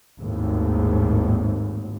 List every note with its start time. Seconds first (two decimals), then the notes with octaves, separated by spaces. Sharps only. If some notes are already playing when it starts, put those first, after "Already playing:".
0.21 G#1 D#2 A2